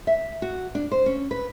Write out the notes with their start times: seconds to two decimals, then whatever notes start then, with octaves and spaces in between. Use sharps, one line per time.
0.07 E5
0.42 F#4
0.75 D4
0.92 C5
1.06 C#4
1.31 B4